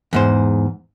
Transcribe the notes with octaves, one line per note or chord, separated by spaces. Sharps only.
E2 G#2 C5